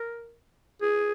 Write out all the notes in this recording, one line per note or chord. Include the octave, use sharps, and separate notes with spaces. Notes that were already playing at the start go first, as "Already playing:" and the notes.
Already playing: A#4
G#4